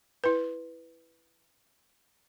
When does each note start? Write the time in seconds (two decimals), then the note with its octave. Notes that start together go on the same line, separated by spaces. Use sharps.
0.24 E4 B4